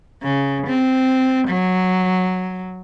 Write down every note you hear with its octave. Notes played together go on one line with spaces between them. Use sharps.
C#3
C4
F#3